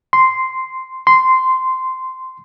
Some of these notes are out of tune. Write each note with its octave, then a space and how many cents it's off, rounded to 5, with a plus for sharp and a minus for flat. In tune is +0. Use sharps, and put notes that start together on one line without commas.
C6 -5
C6 -10